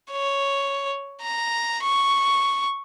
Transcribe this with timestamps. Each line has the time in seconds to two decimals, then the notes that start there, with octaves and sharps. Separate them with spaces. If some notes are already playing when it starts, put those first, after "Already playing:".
0.11 C#5
1.22 A#5
1.83 C#6